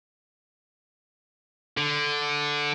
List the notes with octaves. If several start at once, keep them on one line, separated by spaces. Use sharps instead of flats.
D3